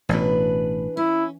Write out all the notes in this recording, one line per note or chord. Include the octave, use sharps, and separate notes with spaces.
A1 B2 E3 D4 B4
C#4 E4